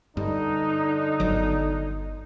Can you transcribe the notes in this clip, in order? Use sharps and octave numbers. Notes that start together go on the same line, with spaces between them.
G2 D3 D#4
G1 F#3